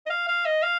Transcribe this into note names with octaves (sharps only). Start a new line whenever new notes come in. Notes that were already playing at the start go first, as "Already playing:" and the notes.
D#5
F5
F5
D#5
F5